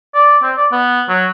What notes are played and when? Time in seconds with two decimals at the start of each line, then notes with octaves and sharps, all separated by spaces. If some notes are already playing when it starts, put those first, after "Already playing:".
0.14 D5
0.43 C4
0.57 D5
0.72 B3
1.08 F#3